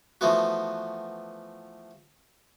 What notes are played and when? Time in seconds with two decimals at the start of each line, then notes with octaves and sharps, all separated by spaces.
0.21 E3 F3 A3 B3 F#4